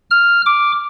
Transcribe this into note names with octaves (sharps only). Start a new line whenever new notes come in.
F6
D6